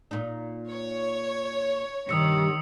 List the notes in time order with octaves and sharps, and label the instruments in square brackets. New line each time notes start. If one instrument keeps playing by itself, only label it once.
[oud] A#2 D#4
[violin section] C#5
[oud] G2 C3 [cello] D#3 [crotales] D#6 E6 C#7